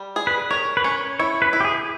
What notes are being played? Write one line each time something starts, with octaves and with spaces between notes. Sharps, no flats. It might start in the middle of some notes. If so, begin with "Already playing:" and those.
Already playing: G3
G#4
B4
A#4 C#5
B4
C#4 C#5
E4 C#5
B4
E4
G4
G#4